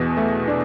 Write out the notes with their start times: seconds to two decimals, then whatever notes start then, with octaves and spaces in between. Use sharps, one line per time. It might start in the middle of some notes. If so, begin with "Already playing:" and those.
Already playing: E2 B2
0.17 A3
0.48 D4